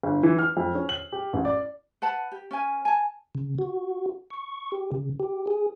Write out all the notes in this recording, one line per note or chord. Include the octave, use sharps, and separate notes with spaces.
G1
E3
F6
F2
C#4
F#7
G4
A1
D5
B4 F#5 A5 B5
G4
C#4 A#4 G#5
G#5 A5
C#3
F#4
C#6
G4
C#3
G4
G#4